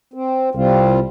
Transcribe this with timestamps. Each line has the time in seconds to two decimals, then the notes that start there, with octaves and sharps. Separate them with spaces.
0.14 C4
0.55 C2 G3 C4 F4